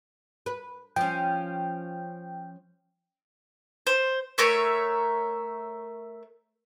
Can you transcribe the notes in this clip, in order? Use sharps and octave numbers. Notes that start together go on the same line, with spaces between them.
B4
F3 C#4 G5
C5
A3 A#4 C#5 E5